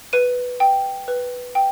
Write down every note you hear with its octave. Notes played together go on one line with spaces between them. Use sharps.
B4 D#7
G5
B4
G5